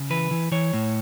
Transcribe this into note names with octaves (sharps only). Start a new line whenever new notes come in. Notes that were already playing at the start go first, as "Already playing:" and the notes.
Already playing: C#3
E3 B4
E3
E3 C#5
A2